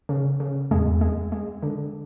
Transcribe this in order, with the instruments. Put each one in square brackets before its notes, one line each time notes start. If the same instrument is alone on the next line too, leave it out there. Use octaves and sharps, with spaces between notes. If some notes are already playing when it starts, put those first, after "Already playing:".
[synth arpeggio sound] C#3
C#3
[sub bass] E2 [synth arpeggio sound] G#3
[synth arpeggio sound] G#3
G#3
D3